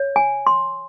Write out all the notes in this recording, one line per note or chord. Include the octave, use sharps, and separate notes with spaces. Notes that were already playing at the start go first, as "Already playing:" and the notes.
Already playing: C#5
G#5
C6